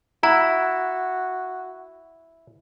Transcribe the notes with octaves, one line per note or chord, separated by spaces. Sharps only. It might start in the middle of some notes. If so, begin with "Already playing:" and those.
E4 F#4 A#5